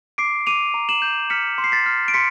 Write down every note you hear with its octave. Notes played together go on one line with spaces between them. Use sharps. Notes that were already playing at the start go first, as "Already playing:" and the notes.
D6 C7 D7
D6 D#7 F7
A#5
E7 F#7
G6
F6 B6 C#7
C6
C7
A6 B6
F6
D7
C6 B6 C#7